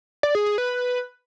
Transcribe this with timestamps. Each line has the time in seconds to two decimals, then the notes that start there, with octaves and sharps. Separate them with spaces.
0.23 D5
0.35 G#4
0.46 G#4
0.58 B4